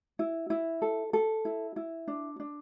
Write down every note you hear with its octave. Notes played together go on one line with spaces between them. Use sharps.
E4
E4
A4
A4
E4
E4
D4
D4